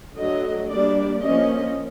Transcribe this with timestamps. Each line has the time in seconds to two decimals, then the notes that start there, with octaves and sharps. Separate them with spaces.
0.17 D3 F#3 A3 D#5
0.70 G3 A#3 D4 D5
1.23 F3 A#3 C#4 D#5